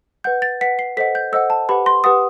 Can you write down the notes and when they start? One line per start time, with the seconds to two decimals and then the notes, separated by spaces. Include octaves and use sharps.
0.24 B4 F#5 G6
0.42 A6
0.61 B4 F#5 B6
0.79 C7
0.97 A4 C5 D#5 F#5 B6
1.15 G6
1.32 A4 C5 D#5 F#5 E6
1.50 A5
1.69 G4 B4 F#5 B5
1.86 C6
2.04 G4 B4 F#5 D#6